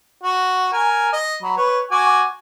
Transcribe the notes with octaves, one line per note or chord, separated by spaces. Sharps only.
F#4
A#4 G#5
D#5
F#3 B5
B4 C#5
F#4 G#5 D6